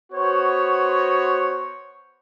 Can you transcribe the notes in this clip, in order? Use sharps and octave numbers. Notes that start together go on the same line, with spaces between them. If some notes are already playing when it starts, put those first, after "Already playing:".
B3 F#4 C5 C#5